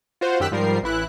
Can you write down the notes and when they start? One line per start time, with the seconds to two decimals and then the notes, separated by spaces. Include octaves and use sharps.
0.21 F4 F#4 C5
0.40 F#2 D#3 G4 E6 F#6 B6
0.51 G#2 F3 G3 A#4 C7
0.83 A1 E3 E4 F#6